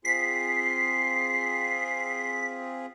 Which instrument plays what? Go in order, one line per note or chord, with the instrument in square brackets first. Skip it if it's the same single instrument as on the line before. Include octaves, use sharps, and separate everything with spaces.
[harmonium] C4 F4 G#4 [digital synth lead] B6 [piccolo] C7